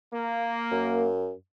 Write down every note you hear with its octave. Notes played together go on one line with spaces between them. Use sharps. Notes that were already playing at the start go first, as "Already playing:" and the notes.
A#3
F#2